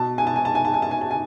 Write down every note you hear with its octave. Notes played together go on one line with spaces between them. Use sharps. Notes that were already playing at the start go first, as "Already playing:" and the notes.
Already playing: B2 A5
G#5
A5
G#5
A5
G#5
A5
G#5
A5
G#5
A5
G#5